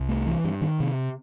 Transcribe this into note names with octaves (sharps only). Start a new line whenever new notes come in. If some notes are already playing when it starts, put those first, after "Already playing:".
Already playing: C2
A3
E3
G2
D#3
C3